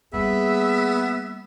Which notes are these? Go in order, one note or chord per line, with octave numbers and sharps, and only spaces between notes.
G3 A#3 B3 G#4 E5